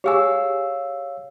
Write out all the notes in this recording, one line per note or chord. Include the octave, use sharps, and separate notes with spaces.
G4 G#4 C#5 F5 G#5 E6